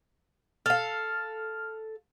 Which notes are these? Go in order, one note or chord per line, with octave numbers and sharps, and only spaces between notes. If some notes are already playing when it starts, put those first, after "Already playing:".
A4 F5 F6